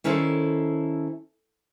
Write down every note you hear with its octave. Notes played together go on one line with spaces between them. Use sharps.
D#3 C#4 E4 A4 C5